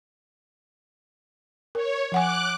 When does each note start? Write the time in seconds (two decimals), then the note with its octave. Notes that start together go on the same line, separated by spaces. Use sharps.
1.75 A#4 C#5
2.12 F3 F#5 G#5 D6 F#6